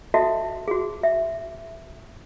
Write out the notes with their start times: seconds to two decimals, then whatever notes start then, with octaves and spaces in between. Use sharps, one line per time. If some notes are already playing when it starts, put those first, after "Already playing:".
0.14 F#4 A4 D#5 E5 A5
0.68 F#4 G#4
1.03 E5